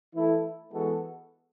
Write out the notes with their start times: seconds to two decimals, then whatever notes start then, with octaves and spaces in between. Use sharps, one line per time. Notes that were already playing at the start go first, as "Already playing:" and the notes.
0.14 E3 A3 E4 A4
0.72 E3 G#3 B3 F#4 A4